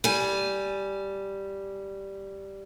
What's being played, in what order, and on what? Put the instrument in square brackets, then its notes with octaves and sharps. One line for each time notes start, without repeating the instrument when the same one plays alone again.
[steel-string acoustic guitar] G3 G#5